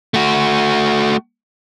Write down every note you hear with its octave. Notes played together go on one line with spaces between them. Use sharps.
A3 F#4